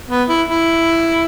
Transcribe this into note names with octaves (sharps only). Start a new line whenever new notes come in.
B3
E4
E4